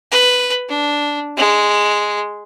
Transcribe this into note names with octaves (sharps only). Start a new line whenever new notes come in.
B4
D4
G#3